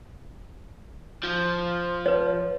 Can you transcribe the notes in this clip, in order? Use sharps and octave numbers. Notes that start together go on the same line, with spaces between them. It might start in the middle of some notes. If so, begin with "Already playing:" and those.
F3
B4 C#5